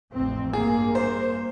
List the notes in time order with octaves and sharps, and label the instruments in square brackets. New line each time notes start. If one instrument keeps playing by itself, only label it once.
[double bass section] A1 F2 C4
[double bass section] G2 A#3 [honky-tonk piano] G#4
[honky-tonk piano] C5